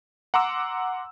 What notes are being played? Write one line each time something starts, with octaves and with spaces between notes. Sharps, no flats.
F#5 A#5 C6 D6 E6